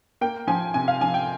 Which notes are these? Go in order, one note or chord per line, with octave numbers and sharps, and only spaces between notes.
A#3 G5
F3 G#5
C3 G#5
F5
F3 G#5
G5